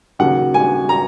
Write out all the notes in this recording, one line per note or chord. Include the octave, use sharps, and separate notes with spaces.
D#2 C#3 F#3 F#5
G#5
A#5